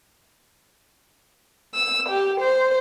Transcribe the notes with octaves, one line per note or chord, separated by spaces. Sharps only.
E6
G4
C5